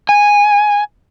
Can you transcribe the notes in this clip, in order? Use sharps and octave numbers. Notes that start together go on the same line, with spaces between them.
G#5